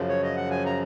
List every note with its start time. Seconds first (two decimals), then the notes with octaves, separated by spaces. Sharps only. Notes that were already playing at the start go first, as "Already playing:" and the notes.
Already playing: F#2 C#3 F3
0.09 C#5
0.23 D#5
0.36 F#5
0.50 G#5
0.66 A#5